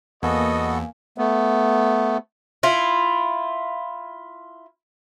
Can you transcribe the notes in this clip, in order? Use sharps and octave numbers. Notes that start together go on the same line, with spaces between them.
E2 A#3 B3 F#4 A4 D#5 F5 G#5
A3 B3
E4 F4